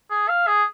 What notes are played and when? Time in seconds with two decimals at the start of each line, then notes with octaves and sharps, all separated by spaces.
0.10 G#4
0.28 F5
0.47 G#4